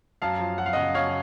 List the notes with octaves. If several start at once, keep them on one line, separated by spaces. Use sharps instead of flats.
F#2 F5 A5
F3
F#2 F#5
F5
C#3 D#5 F#5
F#2 C#5 F5